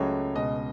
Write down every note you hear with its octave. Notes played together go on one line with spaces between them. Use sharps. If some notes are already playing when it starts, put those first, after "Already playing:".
Already playing: C#2 C#3 F#3 A3 C#5
C#2 B2 G#3 D#5